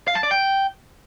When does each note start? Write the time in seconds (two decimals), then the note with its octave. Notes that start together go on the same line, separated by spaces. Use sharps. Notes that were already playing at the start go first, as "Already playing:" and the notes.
0.08 F5
0.15 A5
0.23 D5
0.31 G5